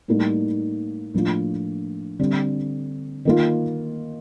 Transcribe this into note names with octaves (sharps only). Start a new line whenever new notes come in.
A2 G3 A#3 D#4
A2 F3 A#3 D4 F4
D3 G3 C4
D#3 A#3 F4